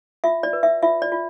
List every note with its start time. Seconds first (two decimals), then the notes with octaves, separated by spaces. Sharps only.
0.24 F4 E5
0.43 D5
0.53 B4
0.63 E5
0.82 F4 E5
1.02 D5
1.12 F4